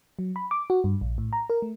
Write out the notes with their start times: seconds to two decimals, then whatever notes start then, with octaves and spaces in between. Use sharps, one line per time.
0.19 F#3
0.36 B5
0.51 D6
0.70 F#4
0.84 G2
1.01 A#1
1.18 A2
1.33 A#5
1.50 A#4
1.62 A3